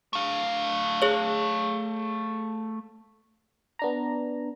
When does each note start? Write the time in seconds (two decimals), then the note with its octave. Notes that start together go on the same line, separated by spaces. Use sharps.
0.13 A3 F5
1.02 G#4 C#5
3.79 B3 D4 A#5